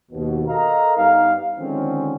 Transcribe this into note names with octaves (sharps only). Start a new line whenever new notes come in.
D#2 B2
A4 A#4 D#5 F5 A#5
G2 G3 B3 D#4 F5
D3 D#3 F3 G#3 C4 C#4